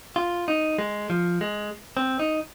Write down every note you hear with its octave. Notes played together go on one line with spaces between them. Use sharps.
F4
D#4
G#3
F3
G#3
C4
D#4